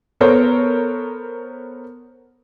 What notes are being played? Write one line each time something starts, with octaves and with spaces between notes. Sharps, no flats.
B3 A4 A#4 C5 C#5